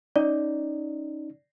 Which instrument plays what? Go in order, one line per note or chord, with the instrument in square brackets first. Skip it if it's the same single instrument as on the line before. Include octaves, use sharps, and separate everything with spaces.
[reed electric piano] C#4 D#4 [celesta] D5